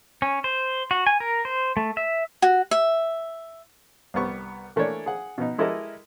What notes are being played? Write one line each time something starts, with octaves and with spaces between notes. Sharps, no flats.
C#4
C5
F#4
G#5
A#4
C5
A3
E5
F#4
E5
C2 G3 B3 C#6
E3 A3 A#3 D4 C#5 D5
G#4 F#5
B2 B3 D#4
G#3 E4 G4 A4 A#4 D#5